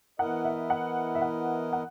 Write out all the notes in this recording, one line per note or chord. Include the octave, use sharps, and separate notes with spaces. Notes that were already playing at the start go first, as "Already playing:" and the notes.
E3 B3 E4 A#4 D#5 F#5
E5
F#5
E5
F#5
F#5